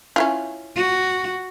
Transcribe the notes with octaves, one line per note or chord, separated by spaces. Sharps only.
C#4 E4 F4
F#4